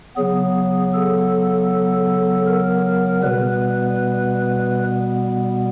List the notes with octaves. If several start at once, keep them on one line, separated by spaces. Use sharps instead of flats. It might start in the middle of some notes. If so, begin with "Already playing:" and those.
C#3 F#3 B3 G#4
A4
A#4
B2 G3 B3 B4